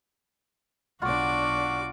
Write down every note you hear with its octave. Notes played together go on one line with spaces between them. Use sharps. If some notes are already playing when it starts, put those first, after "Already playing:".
B1 D4 F4 F#4 F#5 C#6 D6